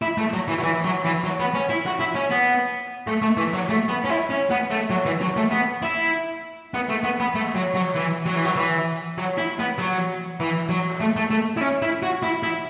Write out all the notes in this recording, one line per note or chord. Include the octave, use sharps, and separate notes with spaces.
E4
A3
F#3
E3
F#3
E3
F#3
E3
F#3
B3
C#4
E4
F#4
E4
C#4
B3
A3
A3
E3
F#3
A3
B3
C#4
E4
C#4
B3
A3
F#3
E3
F#3
A3
B3
E4
B3
A3
B3
B3
A3
F#3
F#3
E3
F#3
E3
F#3
E3
F#3
E4
B3
F#3
E3
F#3
A3
A3
A3
E4
C#4
E4
F#4
E4
E4